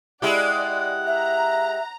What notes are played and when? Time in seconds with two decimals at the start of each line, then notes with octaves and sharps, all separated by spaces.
0.22 G#3 E4 G4 D5 F#5
1.07 E5 A#5